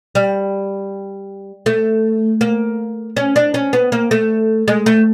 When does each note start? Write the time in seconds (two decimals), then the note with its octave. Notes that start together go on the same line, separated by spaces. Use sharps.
0.15 G3
1.66 A3
2.41 A#3
3.17 C#4
3.36 D4
3.54 C#4
3.73 B3
3.92 A#3
4.11 A3
4.68 G#3
4.86 A3